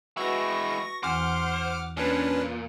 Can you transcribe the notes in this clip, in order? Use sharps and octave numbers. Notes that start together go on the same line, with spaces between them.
G#3 E4 F#4 B4 F#5 C#6 A#6
E2 E3 C4 C5 F#5 D6 F6
A#2 C#4 D4 B4